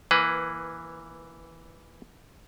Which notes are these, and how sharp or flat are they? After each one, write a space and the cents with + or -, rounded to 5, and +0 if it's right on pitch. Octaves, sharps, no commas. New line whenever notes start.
E3 +0 A#3 +15 B4 +15